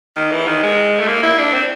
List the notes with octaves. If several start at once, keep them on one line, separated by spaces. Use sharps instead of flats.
D#3
E3
D#3
G#3
A3
A#3
E4
D4
C4